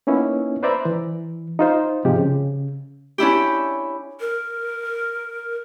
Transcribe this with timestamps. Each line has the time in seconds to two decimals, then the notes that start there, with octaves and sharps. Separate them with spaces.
0.07 A#3 B3 C#4 D#4 E4
0.63 B4 C5 D5 E5 A#5 B5
0.85 E3
1.59 D#4 F4 C5
2.05 G#2 C3 F3 G#3 G4
2.18 C#3
3.18 C#4 D4 E4 G4
4.20 A#4